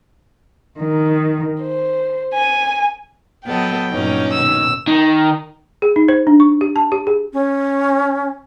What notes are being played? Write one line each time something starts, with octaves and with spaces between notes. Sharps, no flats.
D#3
C5
G#5
F#3 B3 A4 D#5 G5
G2 A#2 F#3 C#4 D#4
B2 D#3 E6
D#3
G#4
D#4
C5
D4
C#6
G4
A5
G4
G#4
C#4